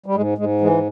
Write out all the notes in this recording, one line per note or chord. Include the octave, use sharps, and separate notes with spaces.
G3
G#2 G#3
G#2 G#3
E3 G#3